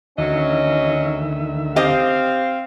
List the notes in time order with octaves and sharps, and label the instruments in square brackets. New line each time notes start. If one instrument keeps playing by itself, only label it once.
[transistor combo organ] D2 D#3 E5 [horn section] F#3 C#4 [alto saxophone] D#5
[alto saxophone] C4 [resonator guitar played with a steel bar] G4 D#5 [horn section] F5